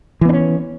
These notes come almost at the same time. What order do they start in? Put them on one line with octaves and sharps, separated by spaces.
E3 B3 D4 C#4